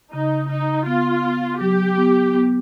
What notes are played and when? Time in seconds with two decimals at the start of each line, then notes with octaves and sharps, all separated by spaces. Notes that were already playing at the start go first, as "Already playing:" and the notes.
0.13 C#3 D#4
0.50 C#3 D#4
0.86 B3 F4
1.24 B3
1.61 F#3 G4
1.98 B3
2.35 B3